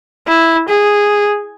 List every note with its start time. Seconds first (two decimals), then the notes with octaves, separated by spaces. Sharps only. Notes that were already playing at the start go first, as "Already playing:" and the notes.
0.28 E4
0.69 G#4